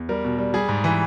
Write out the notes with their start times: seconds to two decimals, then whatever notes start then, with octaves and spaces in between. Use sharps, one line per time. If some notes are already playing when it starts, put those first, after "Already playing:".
Already playing: E2
0.09 G3 A#4
0.24 B2
0.38 G3
0.54 G3 G#4
0.68 G#2
0.84 E3